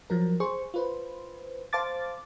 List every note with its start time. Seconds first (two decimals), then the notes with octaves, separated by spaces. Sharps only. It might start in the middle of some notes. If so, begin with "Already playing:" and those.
0.10 F3 F#3 A#4
0.40 G#4 C5 C#6
0.74 F4 B4 C5
1.73 C5 F5 A5 D6 A6